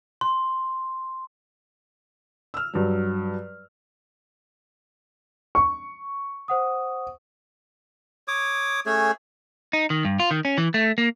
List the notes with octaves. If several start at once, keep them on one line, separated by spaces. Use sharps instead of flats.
C6
E6 F6
G2 F#3
C#6
C5 F#5 D#6
C#5 D6 D#6
A3 C#4 G#4 C#5
D#4
D#3
G2
F4
D#3
C#4
E3
A3
A#3